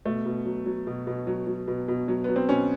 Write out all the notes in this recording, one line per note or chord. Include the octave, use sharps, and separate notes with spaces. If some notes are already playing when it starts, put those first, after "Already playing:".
B2 A3
B2
F#3
F#3
B2
B2
F#3
F#3
B2
B2
F#3
F#3 B3
C4
B2 C#4